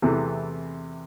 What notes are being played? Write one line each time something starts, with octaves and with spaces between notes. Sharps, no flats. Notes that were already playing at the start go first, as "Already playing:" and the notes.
E2 C3 E3 A3 C4